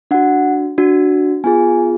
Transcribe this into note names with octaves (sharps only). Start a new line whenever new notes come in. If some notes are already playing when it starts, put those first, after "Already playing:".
D4 F#4 F#5
D4 F#4
B3 F4 G#4 G#5